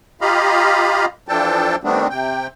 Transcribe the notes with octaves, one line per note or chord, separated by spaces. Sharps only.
F4 G4 D#5 F5 A#5 B5
E3 F3 D4 A4 G5 A5
D#3 G3 A3 B3 C4 D4
C3 G5